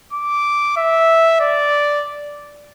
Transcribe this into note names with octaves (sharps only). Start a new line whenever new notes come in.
D6
E5
D5